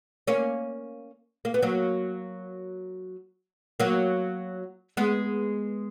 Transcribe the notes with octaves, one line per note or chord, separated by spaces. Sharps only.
A#3 C#4
A#3
B3
F#3 A#3
F#3 A#3
G#3 B3